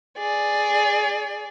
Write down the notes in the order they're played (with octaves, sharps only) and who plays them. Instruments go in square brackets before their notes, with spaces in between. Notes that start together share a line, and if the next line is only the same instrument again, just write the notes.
[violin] G#4 D5